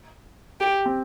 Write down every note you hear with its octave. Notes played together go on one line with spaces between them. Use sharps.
G4
C4